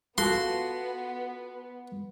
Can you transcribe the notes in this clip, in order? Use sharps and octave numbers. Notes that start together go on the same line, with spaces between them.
B3 F4 F#4 A4 C6